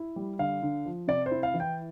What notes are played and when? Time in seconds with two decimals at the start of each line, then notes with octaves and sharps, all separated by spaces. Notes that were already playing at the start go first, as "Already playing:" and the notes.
Already playing: E4
0.16 G3
0.39 D3 F5
0.63 D3
0.86 F3
1.08 C3 D5
1.26 C5
1.31 E4
1.43 F5
1.54 E3
1.60 G5